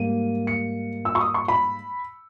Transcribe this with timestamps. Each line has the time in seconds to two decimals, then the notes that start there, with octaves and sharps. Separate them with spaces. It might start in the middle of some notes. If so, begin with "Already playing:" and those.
Already playing: G#2 G3 A#3 D#7
0.47 C#7
1.05 E6
1.15 C#6
1.21 D#6
1.34 C#6
1.48 B5